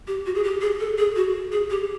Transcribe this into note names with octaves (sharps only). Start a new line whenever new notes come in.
G4
F#4
G#4
G4
G#4
A4
G#4
F#4
G#4
G4